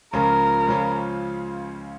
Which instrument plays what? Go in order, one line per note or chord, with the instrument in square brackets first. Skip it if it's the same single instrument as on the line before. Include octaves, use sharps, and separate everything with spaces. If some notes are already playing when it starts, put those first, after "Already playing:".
[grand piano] C#2 C#3 F3 C#4 F4 [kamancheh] A#4
[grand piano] C#2 C#3 F3 C#4 F4